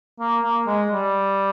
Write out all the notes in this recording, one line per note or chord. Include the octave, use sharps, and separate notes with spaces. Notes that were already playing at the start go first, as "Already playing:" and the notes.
A#3
A#3
G#3
G3